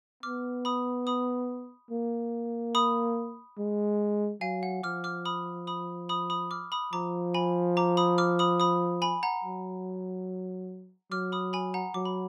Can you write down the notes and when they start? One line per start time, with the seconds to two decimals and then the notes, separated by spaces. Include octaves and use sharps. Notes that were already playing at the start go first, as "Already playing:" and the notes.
0.23 B3 D6 F6
0.65 B5 D#6
1.07 B5 D#6
1.91 A#3
2.75 B5 D#6
3.59 G#3
4.41 F#3 F5 G#5
4.63 F#5
4.83 F3 D6 F6
5.04 D6 F6
5.25 B5 D#6
5.67 B5 D#6
6.09 B5 D#6
6.30 B5 D#6
6.51 D6 F6
6.72 B5 D#6
6.93 F3 A#5 D6
7.34 G#5 B5
7.77 A#5 D6
7.97 B5 D#6
8.18 D6 F6
8.39 B5 D#6
8.60 B5 D#6
9.02 G#5 B5
9.23 F#5 A#5
9.44 F#3
11.12 F#3 D6 F6
11.32 B5 D#6
11.53 G#5 B5
11.74 F#5 A#5
11.94 F#3 D6
12.05 B5